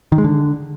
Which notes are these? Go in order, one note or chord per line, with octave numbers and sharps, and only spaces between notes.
D#3
G#3
D3